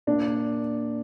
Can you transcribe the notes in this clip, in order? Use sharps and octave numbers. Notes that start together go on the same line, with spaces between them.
A#2 D4